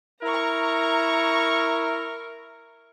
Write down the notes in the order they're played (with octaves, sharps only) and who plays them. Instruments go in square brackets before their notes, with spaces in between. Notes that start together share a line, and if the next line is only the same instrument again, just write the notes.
[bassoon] E4 [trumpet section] A#4 [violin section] A#5 C#6